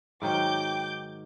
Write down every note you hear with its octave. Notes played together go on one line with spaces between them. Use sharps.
G#2 D#3 F#3 G5 D6 G6